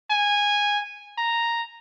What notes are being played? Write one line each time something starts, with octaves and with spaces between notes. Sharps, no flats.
G#5
A#5